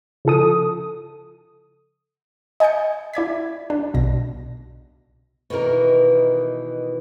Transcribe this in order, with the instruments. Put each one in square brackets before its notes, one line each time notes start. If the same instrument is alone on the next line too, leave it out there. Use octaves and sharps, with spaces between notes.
[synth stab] C#3 F3 A4 D#6
[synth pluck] D#5 G#5 A5 G6 C#7
E4 D5 G#6 B6
D4
B1 B2 A#6
[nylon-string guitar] B2 D#3 E3 A#4